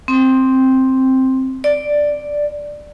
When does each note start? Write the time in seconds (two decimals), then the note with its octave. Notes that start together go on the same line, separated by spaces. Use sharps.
0.08 C4
1.64 D5